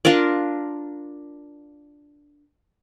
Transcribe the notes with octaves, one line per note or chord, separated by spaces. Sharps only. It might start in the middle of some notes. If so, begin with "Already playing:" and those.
D4 F4 A#4 D5